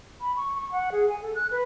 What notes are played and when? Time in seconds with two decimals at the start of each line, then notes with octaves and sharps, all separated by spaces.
0.21 B5
0.37 C#6
0.55 C#6
0.72 F#5
0.92 G#4
1.09 G#5
1.22 A4
1.35 F#6
1.51 B4